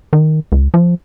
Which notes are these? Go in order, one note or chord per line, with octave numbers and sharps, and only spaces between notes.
D#3
C#2
F3